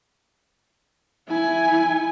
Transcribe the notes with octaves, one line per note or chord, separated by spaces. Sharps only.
E4 G#5